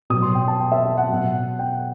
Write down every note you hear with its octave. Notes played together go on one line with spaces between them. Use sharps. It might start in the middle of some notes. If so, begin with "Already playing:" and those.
B2 F#3 D#6
C6
G5
A5
G5
E5
E5
F#5
B2 F#3
G5